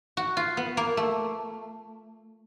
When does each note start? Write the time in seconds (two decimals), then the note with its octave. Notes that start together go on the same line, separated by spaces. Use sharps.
0.17 F#4
0.37 F4
0.57 B3
0.77 A#3
0.97 A3